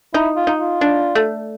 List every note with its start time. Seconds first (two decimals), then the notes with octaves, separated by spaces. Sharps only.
0.14 D#4 E4
0.36 F4
0.47 D#4
0.59 F4
0.81 D4
1.15 A3